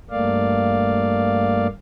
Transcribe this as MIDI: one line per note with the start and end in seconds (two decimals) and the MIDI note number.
0.11 1.67 43
0.11 1.67 57
0.11 1.67 58
0.11 1.67 74
0.11 1.67 77